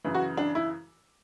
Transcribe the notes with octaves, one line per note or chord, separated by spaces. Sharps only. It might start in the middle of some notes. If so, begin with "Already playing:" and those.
F#2 C#3 E3
F#4
D4
E4